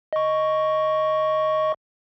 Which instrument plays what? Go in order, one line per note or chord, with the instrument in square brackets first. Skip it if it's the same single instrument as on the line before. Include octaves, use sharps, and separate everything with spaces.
[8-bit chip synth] D#5 C#6